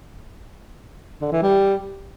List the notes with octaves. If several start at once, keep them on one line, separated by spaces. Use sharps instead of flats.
D3
E3
G3